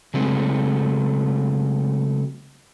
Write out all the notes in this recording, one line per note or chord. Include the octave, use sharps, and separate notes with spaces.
C#3 F#3 G#3 A3 C4